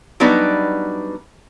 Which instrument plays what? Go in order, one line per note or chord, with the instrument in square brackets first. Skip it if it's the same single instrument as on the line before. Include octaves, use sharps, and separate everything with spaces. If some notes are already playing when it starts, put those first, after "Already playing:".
[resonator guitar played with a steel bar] F#3 G3 B3 D4 D#4 B4